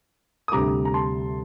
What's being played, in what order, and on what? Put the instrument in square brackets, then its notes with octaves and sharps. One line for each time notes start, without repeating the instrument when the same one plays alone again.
[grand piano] D#6
D2 C3 G3 A#5 D6
A#5
A5 C6